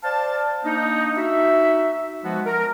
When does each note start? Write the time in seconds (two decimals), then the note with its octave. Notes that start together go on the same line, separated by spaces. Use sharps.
0.04 C5 D5 F5 A5
0.64 A#3 D4 D#4
1.16 D#4 F#4 E5
2.24 F3 G#3 B3 F#4
2.46 A#4